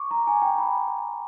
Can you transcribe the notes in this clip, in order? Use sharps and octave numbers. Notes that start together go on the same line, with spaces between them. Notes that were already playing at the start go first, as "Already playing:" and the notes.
Already playing: C#6 D6
A#5
G#5
G5
B5